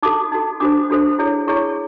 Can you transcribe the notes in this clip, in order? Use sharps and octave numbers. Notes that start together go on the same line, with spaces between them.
D#4 F#4 A4 D6
D#4 F#4 A4
D4 F#4 A4 C5 D6
D4 F#4 A4 C5
E4 G#4 C#5
E4 G#4 C#5 C#6